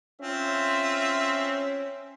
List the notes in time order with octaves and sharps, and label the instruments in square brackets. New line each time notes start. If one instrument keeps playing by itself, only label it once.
[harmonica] C4 F4 [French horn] C#4 [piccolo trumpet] E5